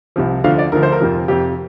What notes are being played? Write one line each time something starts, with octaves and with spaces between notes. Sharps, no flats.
C2 C3 F3
D2 D3 F3 F5
D5
D2 D3 F3 A#4
C5
A#4
F2 C3 F3
F2 C3 F3 G4